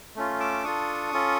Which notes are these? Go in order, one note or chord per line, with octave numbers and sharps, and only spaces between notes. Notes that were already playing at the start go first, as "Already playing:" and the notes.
A3 C#4 F4
D6 E6
D4 F4 A4 C#6 D#6
C#4 F4 A4